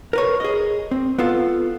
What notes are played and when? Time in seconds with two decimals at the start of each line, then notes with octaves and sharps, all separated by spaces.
0.13 A#4 B4 C#5
0.40 G#4 D#5
0.91 C4
1.18 B3 F4 A4